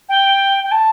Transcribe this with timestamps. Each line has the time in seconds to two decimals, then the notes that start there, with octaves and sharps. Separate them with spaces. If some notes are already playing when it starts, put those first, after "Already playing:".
0.09 G5
0.64 G5
0.71 A5